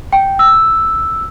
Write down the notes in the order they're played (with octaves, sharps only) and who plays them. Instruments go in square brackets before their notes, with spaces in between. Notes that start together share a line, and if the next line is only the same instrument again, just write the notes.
[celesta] G5
E6